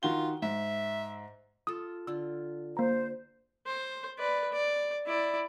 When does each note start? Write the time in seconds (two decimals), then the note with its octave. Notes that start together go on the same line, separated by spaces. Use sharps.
0.03 D#3 F4 F#4 G7
0.42 G#2 E5
1.67 F4 A4 D#6
2.07 D3 F4 E6
2.77 A#3 C5 A#5
3.66 C5
4.19 B4 D5
4.52 D5
5.06 E4 D5